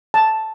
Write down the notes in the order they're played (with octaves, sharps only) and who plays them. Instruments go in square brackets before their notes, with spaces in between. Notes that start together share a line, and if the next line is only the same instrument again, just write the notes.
[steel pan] A5